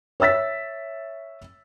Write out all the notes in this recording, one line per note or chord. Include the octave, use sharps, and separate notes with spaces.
C#5 E5 E6 A6 B6